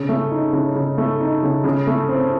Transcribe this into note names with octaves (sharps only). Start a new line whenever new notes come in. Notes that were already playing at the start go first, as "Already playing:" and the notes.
Already playing: C#3
A3
D#4
C#3
C#3
A3
D#4
C#3
C#3
A3
C4